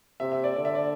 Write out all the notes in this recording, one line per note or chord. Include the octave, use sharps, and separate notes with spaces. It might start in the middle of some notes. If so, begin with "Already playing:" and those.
C3 E5
E5
D5
D3 D5
E5
D5